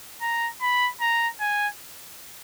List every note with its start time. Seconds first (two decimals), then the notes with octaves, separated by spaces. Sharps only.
0.22 A#5
0.62 B5
1.01 A#5
1.40 G#5